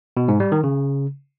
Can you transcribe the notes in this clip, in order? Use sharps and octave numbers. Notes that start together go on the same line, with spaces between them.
B2
G#2
G3
D#3
C#3